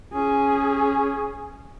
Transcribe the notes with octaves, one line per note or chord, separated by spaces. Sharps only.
C#4 G#4